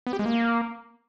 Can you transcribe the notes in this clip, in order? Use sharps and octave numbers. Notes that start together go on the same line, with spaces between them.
B3
G4
G#3
A#3